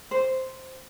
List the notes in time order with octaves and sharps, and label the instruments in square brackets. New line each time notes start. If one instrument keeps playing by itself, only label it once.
[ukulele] C5